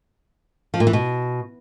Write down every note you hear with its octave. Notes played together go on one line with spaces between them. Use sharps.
F3
A#2
E3
B2